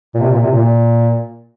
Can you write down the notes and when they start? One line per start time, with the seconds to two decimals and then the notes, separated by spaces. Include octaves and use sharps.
0.15 A#2
0.20 C3
0.31 A#2
0.42 C3
0.52 A#2